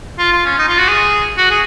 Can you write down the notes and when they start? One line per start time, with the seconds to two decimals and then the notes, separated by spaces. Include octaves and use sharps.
0.19 F4
0.32 F4
0.46 C#4
0.59 D#4
0.69 F4
0.78 F#4
0.88 G#4
1.38 F#4
1.51 G#4